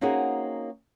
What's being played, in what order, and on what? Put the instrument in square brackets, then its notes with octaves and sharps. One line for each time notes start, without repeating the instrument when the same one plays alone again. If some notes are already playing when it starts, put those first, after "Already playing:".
[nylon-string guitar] A#3 C4 C#4 D#4 F#4 G#4